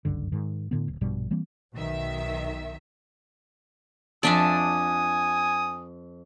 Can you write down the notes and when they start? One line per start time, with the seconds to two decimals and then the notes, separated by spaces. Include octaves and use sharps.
0.05 F#1 C#2 G2 D3
0.32 G#2 D#3
0.71 A2 D3 B3
0.88 D1
1.01 A#1 G2 B2 G3
1.31 E3 G3 A#3 C4
1.74 B1 D#3 E5
4.23 F2 D4 D5 E5 G#5 A5 D#6